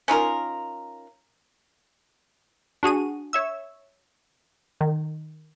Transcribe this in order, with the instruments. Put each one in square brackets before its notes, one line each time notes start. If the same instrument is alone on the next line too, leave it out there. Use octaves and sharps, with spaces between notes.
[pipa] C#4 D#4 F4 A#4
[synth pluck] D4 F#4 G#4 D#7
C#5 E5 E6
D#3